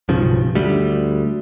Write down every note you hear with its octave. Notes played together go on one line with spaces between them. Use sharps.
B1 G2 C#3 F3
D2 G3